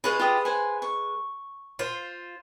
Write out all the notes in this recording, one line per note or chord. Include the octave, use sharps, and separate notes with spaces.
G#3 F4 G#4 B4 C#5
F4 G4 D#6
C5 F#5 G#5
C#6
F4 C5